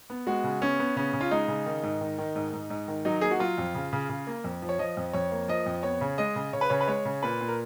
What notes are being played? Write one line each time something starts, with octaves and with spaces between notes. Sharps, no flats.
B3
G#3 F#4
C#3
B3 C#4
B3
C#3 C#4
C#3
F4
G#3 D#4
C#3
D#3
G#2
D#3
D#3
G#2
G#2
G#2
D#3
F#3 D#4
A#3 G#4
F#4
F#3 F4
F2
C#3
C#3
C#3
A#3
F2
F3
C#5
F3 D#5
F2
F2 C#5
A#3
F3 D#5
F2
B3 C#5
C#3
G#3 D#5
C#3
C#3 C#5
B4
C#3 C#5
B4
G#3 C#5
C#3
A#2 B4
A#2
A#4